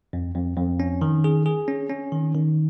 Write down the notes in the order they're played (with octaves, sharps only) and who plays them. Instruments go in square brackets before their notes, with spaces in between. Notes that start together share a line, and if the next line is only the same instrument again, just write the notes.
[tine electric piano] F2
F2
F2
C#4
D#3
G#4
G#4
C#4
C#4
D#3
D#3